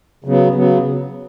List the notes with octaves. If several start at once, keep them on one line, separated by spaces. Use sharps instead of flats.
C#3 F#3 B3
C#3 F#3 B3